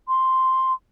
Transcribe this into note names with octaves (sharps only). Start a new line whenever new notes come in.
C6